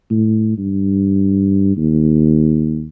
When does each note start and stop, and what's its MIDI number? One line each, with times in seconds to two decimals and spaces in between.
0.10 0.56 45
0.58 1.77 43
1.77 2.87 39